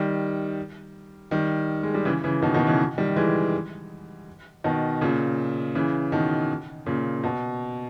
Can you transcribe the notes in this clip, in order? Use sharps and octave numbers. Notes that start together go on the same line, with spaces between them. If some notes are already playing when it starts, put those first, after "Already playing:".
Already playing: D#3 G3
D#3 G3
G#3
G3
C#3 E3
C#3 E3
B2 D#3
B2 D#3
C#3 E3
D#3 G3
E3 G#3
B2 D#3
A#2 C#3
C#3 E3
B2 D#3
A#2 C#3
B2